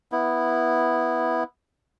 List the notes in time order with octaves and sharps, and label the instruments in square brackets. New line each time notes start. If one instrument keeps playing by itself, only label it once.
[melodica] B3 E4